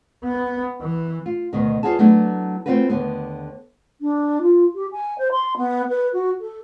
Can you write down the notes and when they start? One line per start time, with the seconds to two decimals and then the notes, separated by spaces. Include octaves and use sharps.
0.24 B3
0.81 E3
1.26 F4
1.53 D2 B2 D#3
1.83 E2 C3 F4 F#4 G#4 A5
1.99 F#3 A3 B3 D4 E4
2.66 A3 C4 C#4 F4 F#4 B4
2.90 D#2 D3 B3
4.01 D4
4.41 F4
4.74 G4
4.91 G#5
5.18 C5
5.31 C6
5.56 B3
5.89 B4
6.13 F#4
6.40 A4